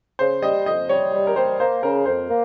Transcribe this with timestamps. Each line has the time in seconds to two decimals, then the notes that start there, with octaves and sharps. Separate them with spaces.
0.19 C#3 C5
0.42 G3 D#5
0.66 F2 D#5
0.89 G3 C#5
1.13 G3
1.27 A#4
1.36 G3 C5
1.60 A#3 C5
1.83 C#3 A#4
2.06 F2 C5
2.29 A#3